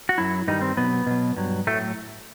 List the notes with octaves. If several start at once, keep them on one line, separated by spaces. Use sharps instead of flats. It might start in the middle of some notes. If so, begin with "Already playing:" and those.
F#4
F#2 F#3 E4
G2 D#3 G3 D#4
C4
B2 F#3 B3
B2 F#3
G2 F#3
A2 F#3 A3